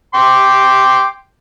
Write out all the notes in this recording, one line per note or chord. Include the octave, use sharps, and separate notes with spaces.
G5 C6 D6